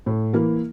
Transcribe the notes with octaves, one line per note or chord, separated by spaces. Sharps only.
A2
E3 A#3 E4 A#4